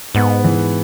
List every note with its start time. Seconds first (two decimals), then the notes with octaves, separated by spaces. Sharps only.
0.15 G#2 B3
0.44 E3